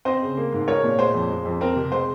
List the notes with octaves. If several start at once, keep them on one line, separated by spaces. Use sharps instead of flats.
C4 C5 D#5
C#3
A#3
G#2
G#3 A#4 C#5
A#2
G#3 C5
F2
G#3
F2
C4 A#4
C3
G#3 C5